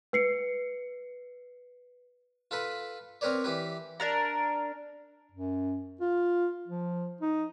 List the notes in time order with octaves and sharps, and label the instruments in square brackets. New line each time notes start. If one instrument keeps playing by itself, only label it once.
[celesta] B4 C7 C#7
[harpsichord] F4 A4 B4 B5
C4 A#4 B4 C#5 D5
E3 G4 B4
[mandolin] D4 A#4 A#5
[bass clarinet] F#2
F4
F3
D#4